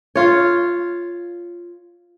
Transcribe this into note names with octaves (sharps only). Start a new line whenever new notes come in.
F4 C#5